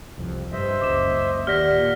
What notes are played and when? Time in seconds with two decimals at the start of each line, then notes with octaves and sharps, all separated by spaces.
0.18 C2 F2
0.52 G2 C5 D#5 E5
0.81 F#1 C#2 D6 E7
1.47 D#2 G4 D5 F#5 F6 A#6 B6
1.71 A#2